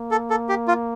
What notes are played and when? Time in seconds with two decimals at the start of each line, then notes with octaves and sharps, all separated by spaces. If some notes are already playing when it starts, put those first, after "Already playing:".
Already playing: A#3
0.11 A4
0.30 A4
0.49 G4
0.68 F4